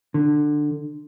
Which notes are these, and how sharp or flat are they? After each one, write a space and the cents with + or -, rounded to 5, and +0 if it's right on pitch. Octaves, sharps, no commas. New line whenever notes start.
D3 +15